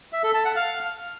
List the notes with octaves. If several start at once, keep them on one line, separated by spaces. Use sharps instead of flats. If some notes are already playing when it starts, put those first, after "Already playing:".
E5
A4
A5
F#5
F5